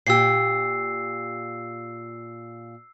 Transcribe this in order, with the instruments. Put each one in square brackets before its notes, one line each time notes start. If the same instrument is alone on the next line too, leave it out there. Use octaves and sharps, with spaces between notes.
[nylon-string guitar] A#2 G4 [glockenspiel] E6 C7